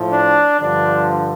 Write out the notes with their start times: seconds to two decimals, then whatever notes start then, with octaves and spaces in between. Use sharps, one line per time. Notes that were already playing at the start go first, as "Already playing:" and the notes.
Already playing: A2 F3
0.11 D4
0.59 G2 D3 F3 D4